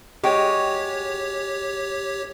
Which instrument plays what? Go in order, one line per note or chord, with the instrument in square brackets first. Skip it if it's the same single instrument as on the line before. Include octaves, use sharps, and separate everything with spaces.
[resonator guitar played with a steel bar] G#3 F#4 G5 [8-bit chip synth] G4 C#5